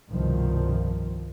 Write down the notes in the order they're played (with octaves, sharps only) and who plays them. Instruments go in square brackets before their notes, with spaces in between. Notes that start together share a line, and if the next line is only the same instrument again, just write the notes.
[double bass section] C2 G2 B2 D#3 F3